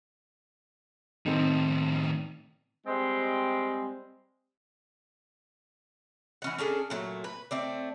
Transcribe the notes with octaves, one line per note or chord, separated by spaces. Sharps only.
A2 D#3 C4 D#4
G3 G#3 C4
E3 C#4 F#5
C#4 D4 G#4 A4
A#2 F#3 A3
B4
A3 C4 D5